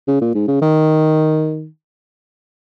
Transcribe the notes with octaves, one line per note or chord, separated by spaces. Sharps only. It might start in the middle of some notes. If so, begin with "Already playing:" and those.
C#3
A#2
G#2
C#3
D#3